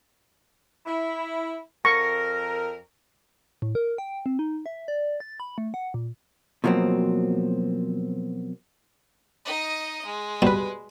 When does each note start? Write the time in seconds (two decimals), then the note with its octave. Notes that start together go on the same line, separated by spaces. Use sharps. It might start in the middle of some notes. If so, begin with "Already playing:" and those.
0.86 E4
1.85 F2 A#4 C#6 A#6
3.62 A2
3.75 A#4
3.98 G5
4.26 C4
4.39 D#4
4.66 E5
4.88 D5
5.20 A6
5.40 B5
5.58 A3
5.74 F#5
5.94 A#2
6.64 B2 F3 F#3 A#3 C4
9.45 D#4 D#5
10.05 G#3
10.42 B2 G3 B4